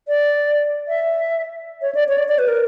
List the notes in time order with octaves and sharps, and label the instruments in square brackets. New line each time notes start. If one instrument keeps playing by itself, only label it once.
[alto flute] D5
E5
C#5
D5
C#5
D5
D5
B4
A#4